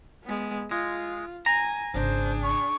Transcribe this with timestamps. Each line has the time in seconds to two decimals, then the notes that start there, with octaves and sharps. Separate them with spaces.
0.24 G#3 B3
0.71 G#3 F4
1.46 G#5 A#5
1.94 G#1 C#3 D4 G#4 C5
2.43 C#6